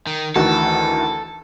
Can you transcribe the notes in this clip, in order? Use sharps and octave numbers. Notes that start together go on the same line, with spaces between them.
D#3
D2 D#3 E3 F#4 A4